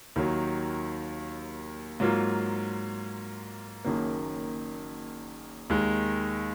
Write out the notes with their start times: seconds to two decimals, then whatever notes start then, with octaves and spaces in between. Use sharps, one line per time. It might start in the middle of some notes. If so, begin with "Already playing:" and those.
0.16 D#2 D#3 F#3
2.00 G#2 F#3 A#3 F4
3.84 F#1 F#2 D#3 A#3
5.70 D#2 D#3 G#3